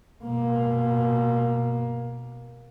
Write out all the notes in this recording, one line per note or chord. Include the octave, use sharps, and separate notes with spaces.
B2 A#3